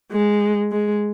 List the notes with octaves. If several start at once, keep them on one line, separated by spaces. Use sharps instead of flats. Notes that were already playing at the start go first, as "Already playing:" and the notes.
G#3
G#3